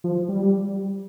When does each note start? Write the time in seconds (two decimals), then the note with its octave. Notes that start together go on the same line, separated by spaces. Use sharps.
0.04 F3
0.29 G3